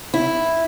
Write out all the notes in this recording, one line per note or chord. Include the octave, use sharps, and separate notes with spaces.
E4